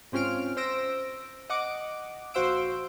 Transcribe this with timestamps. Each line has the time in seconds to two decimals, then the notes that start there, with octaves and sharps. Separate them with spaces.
0.12 G#2 C4 C#4 F4 F6 D7
0.57 C5 E6 A#6 D7
1.50 D#5 F#5 D6
2.34 A#1 F#4 C5 F5 E6 D7